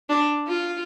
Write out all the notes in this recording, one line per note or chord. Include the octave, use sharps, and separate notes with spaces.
D4
F4